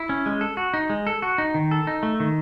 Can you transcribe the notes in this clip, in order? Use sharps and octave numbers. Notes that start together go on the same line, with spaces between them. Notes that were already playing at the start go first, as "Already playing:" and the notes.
Already playing: E4
C#4
G#3
A4
F#4
D#4
G#3
A4
F#4
D#4
D#3
A4
D#4
A3
D#3